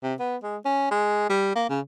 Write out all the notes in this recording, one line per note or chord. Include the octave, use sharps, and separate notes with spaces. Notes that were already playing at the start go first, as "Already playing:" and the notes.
C3
B3
G#3
C#4
G#3
G3
A#3
C#3